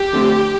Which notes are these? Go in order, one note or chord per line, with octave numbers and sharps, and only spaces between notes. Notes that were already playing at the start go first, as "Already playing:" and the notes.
Already playing: G4
D3 F3 A3 C4